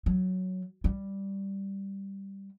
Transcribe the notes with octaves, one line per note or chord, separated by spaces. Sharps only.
F#3
G3